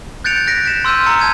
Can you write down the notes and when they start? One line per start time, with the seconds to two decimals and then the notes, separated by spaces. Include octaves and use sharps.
0.24 F#6 G6 A6 C#7 D7 F7
0.47 F#6 G6 A#6 B6 D7
0.65 F#6 A6 B6 E7
0.85 C6 E6 F6 G6 D#7
1.06 A#5 E6 C#7
1.20 A5 G#6 D#7